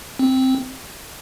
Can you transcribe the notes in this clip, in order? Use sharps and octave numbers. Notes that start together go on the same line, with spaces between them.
C4